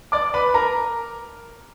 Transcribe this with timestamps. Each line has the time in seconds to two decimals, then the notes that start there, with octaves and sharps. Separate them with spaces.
0.12 D5 D6
0.34 B4 B5
0.54 A#4 A#5